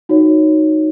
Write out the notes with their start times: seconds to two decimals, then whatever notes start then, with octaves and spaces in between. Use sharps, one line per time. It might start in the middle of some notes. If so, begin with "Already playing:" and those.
0.09 D#4 F#4 C#5